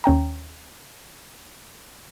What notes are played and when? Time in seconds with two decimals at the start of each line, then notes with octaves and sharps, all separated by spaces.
0.04 D#2 C#4 G5 A#5